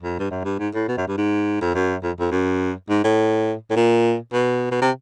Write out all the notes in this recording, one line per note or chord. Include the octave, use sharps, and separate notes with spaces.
F2
G2
F#2
G2
G#2
A2
B2
F#2
G2
G#2
F2
F#2
F2
F2
F#2
G#2
A2
A2
A#2
B2
B2
C3